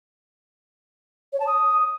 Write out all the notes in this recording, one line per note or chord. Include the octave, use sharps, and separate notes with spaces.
C#5
A5
D#6